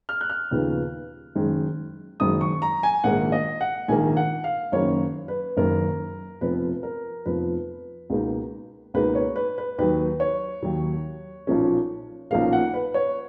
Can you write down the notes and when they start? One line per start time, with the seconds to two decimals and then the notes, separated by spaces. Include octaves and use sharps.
0.09 F6
0.21 F#6
0.30 F6
0.51 D#2 C#3 F3 B3 D#4
1.35 F#1 F#2 D#3 G#3
2.20 F#1 F#2 D#3 G#3 D#6
2.41 C#6
2.62 A#5
2.83 G#5
3.04 A#1 G#2 D#3 A#3 F#5
3.32 D#5
3.61 F#5
3.88 A#1 G#2 D#3 A#3 G#5
4.17 F#5
4.44 F5
4.72 F#1 F#2 D#3 A#3 C#5
5.28 B4
5.57 F#1 F#2 D#3 A#3 A#4
6.41 F1 F2 F3 B3 B4
6.83 A#4
7.25 F1 F2 F3 B3 B4
8.10 C#2 B2 A#3 D#4
8.94 C#2 B2 A#3 D#4 B4
9.15 C#5
9.36 B4
9.58 B4
9.78 D#2 D#3 F#3 B4
10.20 C#5
10.62 D#2 D#3 F#3
11.47 B1 A#2 F3 A#3 C#4
12.31 B1 A#2 F3 A#3 C#4 F5
12.53 F#5
12.74 B4
12.94 C#5